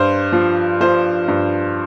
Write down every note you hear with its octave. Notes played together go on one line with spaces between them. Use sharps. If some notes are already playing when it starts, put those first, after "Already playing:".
Already playing: G2 C5
F3
F3 C5
G2